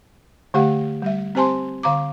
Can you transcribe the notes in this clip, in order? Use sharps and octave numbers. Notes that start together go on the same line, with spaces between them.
D3 A3 G4 F5 F#5
G3 E5
C4 G4 C5 G#5 A5 C6
D3 F5 A#5 D6